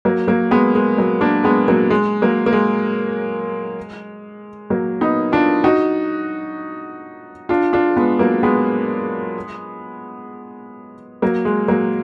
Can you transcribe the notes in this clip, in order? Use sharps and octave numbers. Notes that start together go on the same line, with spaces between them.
F#3 A#3
F#3 A#3
G#3 B3
G#3
F#3
A#3 D4
G#3 B3
F#3 A#3
G#3
F#3 A#3
A#3
G#3
F#3 A#3
B3 D#4
D4 F4
D#4 F#4
D4 F4
D4 F4
G#3 B3
F#3 A#3
G#3 B3
F#3 A#3
G#3
F#3 A#3